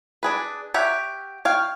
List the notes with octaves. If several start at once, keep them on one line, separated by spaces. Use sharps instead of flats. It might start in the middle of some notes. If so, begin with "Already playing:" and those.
D4 G#4 B4
G4 C#5 E5 F#5
C#5 F5 G5